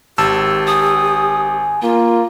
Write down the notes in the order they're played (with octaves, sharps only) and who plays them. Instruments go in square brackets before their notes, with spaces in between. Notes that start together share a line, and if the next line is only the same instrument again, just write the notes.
[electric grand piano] G#1 A5 E6 [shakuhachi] G4
[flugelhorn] G#5 [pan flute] D#6
[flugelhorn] A#3 [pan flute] F4